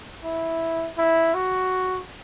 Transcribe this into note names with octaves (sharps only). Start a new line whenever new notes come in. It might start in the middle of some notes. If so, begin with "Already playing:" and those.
E4
E4
F#4